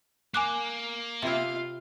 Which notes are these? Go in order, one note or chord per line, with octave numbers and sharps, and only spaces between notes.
A#3 G#5 D6 F#6
C3 E4 F4 F5